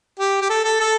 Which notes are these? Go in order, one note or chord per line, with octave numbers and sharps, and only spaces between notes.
G4
G4
A4
A4
A4